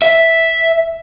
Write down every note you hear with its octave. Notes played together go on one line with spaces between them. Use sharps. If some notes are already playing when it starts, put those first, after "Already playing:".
E5